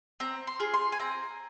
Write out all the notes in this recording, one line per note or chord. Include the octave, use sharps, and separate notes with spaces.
C4 A#5
C6
F4 G#4
C6
G#5
C4 A#5